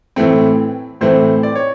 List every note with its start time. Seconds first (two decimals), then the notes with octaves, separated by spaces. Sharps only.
0.16 A2 E3 A3 C4
1.01 A2 E3 A3 C4 C5
1.43 D5
1.55 C#5